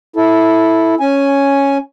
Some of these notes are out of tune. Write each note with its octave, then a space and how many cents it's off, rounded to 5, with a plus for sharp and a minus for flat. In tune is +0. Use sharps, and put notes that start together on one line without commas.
E4 -10 A4 +0
C#4 +0 G#5 +5